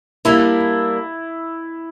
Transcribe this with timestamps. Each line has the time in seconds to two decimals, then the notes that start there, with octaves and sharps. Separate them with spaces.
0.25 G3 A#3 D4 E4